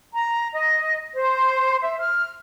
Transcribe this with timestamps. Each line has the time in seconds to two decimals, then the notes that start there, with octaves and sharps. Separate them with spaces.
0.13 A#5
0.53 D#5
1.15 C5
1.81 E5
1.99 F6